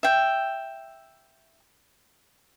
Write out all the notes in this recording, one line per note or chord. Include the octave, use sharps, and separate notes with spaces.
E5 G5